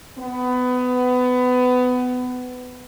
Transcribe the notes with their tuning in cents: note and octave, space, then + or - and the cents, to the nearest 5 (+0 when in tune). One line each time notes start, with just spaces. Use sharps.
B3 +20